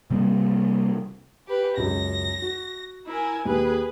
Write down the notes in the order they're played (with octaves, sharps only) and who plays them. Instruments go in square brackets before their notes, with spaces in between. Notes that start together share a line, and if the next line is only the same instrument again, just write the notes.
[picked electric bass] C3 G3 A#3 C4
[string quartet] G4 B4
[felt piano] C#2 F#2 [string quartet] A#6
[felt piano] F#4
[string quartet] E4 A#4 G#5
[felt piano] D#2 [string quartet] G#4 B4